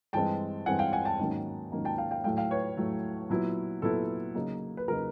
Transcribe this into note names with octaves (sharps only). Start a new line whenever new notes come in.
G2 E3 G#3 C4 G5 A5
G2 E3 G#3 C4 F#5 G#5
F5 G5
F#5 G#5
G5 A5
G#2 D#3 F#3 A#3 C#4
G#2 D#3 F#3 A#3 C#4
G5 A5
F5 G5
F5 G5
A2 F#3 A3 F5 G5
F5 G5
B4 C#5
A2 F#3 A3
A#2 F#3 B3 E4
A#2 F#3 B3 E4 A4
C#3 F#3 A#3 D#4
B4
C#3 F#3 A#3 D#4 A#4